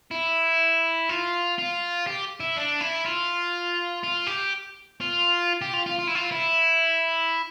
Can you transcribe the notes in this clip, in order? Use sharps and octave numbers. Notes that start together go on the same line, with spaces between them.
E4
F4
F4
G4
E4
D4
E4
F4
F4
G4
F4
G4
F4
F4
F4
E4
F4
E4